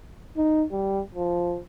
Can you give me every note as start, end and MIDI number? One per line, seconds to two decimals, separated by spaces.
0.37 0.64 63
0.71 1.01 55
1.14 1.59 53